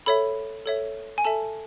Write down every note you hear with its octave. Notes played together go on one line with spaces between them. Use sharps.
A4 C#5 E5 B5
A4 C#5 E5
G#5
A4 E5 A5